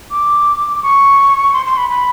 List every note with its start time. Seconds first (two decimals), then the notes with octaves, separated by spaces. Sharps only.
0.11 D6
0.82 C#6
1.53 C6
1.66 C6
1.77 B5
1.90 B5